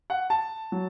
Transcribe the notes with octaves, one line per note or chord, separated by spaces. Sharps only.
F#5
A5
F#3